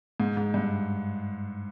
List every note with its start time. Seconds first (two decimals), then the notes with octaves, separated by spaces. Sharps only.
0.20 G#2
0.37 G#2
0.54 G2